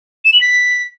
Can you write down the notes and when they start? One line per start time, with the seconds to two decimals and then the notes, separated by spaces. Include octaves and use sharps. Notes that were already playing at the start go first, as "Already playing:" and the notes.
0.25 E7
0.33 F#7
0.41 B6